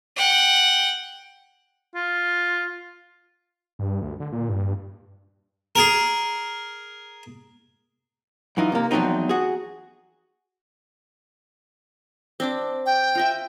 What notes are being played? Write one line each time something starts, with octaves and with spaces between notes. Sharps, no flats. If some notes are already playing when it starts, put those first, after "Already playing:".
F#5 G5
F4
G2
D2
D3
A#2
G2
G#4 A#4
F#2 E3 D#4 F4
C3 A#3
E2 F3 F#3 A3 C4 D#4
F#4 G#4
C4 D4 D6
G5
F4 D#5 E5